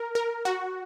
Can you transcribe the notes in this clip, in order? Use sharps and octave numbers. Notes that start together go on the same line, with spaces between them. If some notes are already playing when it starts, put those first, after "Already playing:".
Already playing: A#4
A#4
F#4